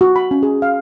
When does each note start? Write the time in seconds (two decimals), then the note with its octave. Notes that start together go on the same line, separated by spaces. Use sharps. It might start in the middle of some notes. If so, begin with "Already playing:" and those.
0.01 F#4
0.16 B5
0.31 C#4
0.43 G#4
0.62 F5